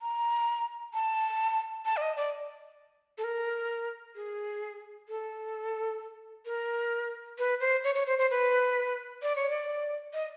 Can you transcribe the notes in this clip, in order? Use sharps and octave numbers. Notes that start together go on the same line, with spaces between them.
A#5
A5
A5
D5
D#5
D5
A4
A#4
G#4
A4
A#4
B4
C5
C#5
C#5
C5
C5
B4
D5
C#5
D5
D#5